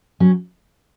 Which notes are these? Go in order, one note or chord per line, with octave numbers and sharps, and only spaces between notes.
F#3 C#4